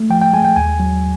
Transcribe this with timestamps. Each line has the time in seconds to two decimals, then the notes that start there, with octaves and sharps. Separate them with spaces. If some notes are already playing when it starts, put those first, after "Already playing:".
Already playing: A3
0.10 F3 G5
0.22 G5
0.33 G#3 G#5
0.45 G5
0.56 D#2 G#5
0.80 F#3